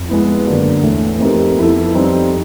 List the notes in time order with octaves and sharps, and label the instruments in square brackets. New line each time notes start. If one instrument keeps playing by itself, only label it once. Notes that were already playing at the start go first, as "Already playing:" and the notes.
Already playing: [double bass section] F2
[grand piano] G#3 B3 E4
[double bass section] F#2 [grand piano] D3 F#3 A#3 D4 F#4
[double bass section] E2 [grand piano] A2 E3 A3
[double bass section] F2 [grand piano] A3 C4 D#4 G4 A#4
[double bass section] F2 [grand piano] B3 E4 A4
[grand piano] G3 C4 D#4